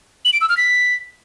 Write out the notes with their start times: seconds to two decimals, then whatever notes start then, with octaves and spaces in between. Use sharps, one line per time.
0.25 F#7
0.33 D7
0.41 E6
0.49 F6
0.57 B6